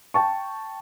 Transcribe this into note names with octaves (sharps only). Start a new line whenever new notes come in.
G5 A5 C#6